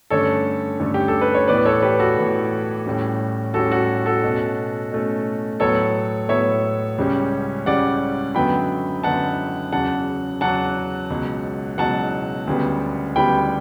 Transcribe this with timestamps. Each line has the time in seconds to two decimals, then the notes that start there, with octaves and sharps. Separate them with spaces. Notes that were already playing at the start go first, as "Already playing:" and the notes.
0.10 G2 D3 A3 C#4 A4 C#5
0.80 G2 D3 A3 C#4
0.94 G4
1.08 A4
1.21 B4
1.34 C#5
1.48 A2 E3 B3 B4 D5
1.65 A4 C#5
1.82 G4 B4
1.99 F#4 A4
2.18 A2 E3 B3
2.86 A2 G3 C#4
3.54 A2 G3 C#4 F#4 A4
3.71 F#4
4.06 F#4 A4
4.23 B2 A3 C#4
4.92 B2 A3 C#4
5.60 A2 F#3 B3 A4 C#5
6.29 A2 F#3 B3 C#5 E5
6.98 C#2 C#3 G3 C#4
7.66 C#2 C#3 G3 C#4 D5 F#5
8.35 F#2 D3 F#3 B3 G5 B5
9.04 F#2 D3 F#3 B3 F#5 A5
9.72 E2 C#3 F#3 F#5 A5
10.41 E2 C#3 F#3 F#5 A5
11.10 C#2 B2 F#3
11.78 C#2 B2 F#3 F#5 A5
12.47 D2 C#3 G3 B3
13.16 D2 C#3 G3 B3 G5 B5